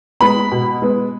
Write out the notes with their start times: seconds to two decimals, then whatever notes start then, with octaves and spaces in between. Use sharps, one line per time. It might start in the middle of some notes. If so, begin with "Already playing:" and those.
0.20 G#3 B3 B5
0.52 B2
0.82 G#3 B3